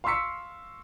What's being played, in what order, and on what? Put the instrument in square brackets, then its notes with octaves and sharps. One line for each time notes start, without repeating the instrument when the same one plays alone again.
[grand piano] F5 C6 C#6 E6 B6 C#7